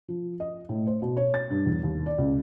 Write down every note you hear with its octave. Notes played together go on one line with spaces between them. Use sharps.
F3
D#5
A2
C5
B2
C#5
A6
G2
E2
D#2
D5
C#2